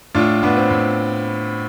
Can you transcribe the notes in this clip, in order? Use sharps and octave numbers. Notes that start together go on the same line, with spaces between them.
A2 D4 F4
A2 B3 D4
C4
A2